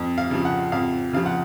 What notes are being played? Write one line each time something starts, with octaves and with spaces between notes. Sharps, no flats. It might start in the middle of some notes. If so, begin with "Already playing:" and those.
Already playing: F2
F5
C#3 F3
F#5
F2 F5
C#3 F3 F5
F#5